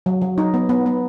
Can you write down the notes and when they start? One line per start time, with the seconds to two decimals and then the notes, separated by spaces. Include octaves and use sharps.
0.06 F#3
0.22 F#3
0.38 D#4
0.54 B3
0.69 B3
0.86 B3